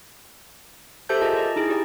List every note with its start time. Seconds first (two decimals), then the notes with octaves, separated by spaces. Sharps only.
1.09 G4 A4 C5 E5 A5 G6
1.21 F4 G#4 A#4 D#5 A5
1.36 D5 D#5
1.56 D#4 E4 G#4
1.69 G4 D5 G5